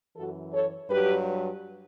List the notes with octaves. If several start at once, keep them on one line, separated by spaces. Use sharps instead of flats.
F#2 E3 F#4 A4
A4 C#5
G2 F#3 G4 B4